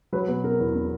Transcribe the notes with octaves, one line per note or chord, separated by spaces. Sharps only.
F#3 B4
B2 B4
B3 A#4
E2
B3